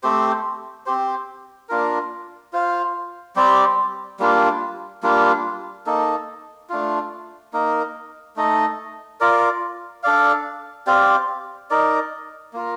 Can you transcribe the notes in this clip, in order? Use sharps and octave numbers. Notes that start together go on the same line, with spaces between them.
A3 C4 G4 C5
C4 G4 C5
A#3 D4 F4 A#4
F4 C5 F5
G3 C4 G4 D5
G3 A#3 D4 F4
G3 A#3 D4 F4
A#3 D#4 A4
A3 D4 F4
A#3 D#4 A#4
A3 D#4 A4 D#5
F4 A#4 D5
D4 A4 D5 F5
C4 G4 D5 F5
D#4 A#4 D5
A#3 F4 A#4